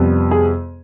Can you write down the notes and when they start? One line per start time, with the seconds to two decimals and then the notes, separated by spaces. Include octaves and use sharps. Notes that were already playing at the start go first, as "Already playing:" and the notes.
Already playing: F2 C3 G3 B3
0.31 G#4